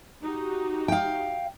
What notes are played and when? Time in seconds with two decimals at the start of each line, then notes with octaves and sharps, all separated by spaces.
0.22 D#4 F#4 G4
0.88 F5 G5